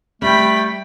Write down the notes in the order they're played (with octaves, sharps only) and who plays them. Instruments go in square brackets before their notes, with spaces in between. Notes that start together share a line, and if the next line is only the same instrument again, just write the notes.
[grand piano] G3 [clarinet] A3 [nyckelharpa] G5 B5